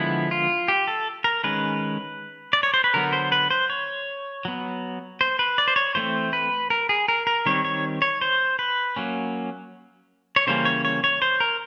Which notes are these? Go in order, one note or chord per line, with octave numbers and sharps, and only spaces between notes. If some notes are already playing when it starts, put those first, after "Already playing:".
Already playing: D3 F3 G#3 B3 E4
F4
G4
A4
A#4
D#3 G#3 C#4 B4
D5
C#5
C5
B4
D3 F#3 B3 A#4
C5
B4
C5
C#5
F#3 B3
C5
B4
D5
C5
C#5
E3 A3 C4 C5
B4
A#4
G#4
A#4
A#4
D#3 G3 C4 C#5
C#5
C#5
C5
B4
F#3 A#3 C#4
C#5
C#3 E3 G3 A#3 C#4 C5
C#5
C#5
C#5
C5
A#4